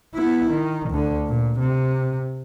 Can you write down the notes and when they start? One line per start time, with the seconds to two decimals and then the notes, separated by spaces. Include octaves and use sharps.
0.15 B3 E4
0.49 D#3
0.90 D2 D3
1.27 A#2
1.59 C3